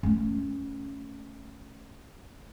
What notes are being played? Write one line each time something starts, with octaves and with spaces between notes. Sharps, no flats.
A3 C#4